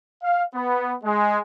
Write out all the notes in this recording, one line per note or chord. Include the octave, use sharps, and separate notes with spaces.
F5
B3
G#3